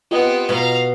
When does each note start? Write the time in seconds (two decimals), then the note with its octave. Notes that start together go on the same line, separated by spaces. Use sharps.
0.11 B3 C4 F4 G4 D#5
0.49 B2 F5 A#5 B5